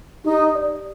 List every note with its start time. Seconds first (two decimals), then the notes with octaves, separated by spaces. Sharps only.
0.24 D#4 G4
0.55 D5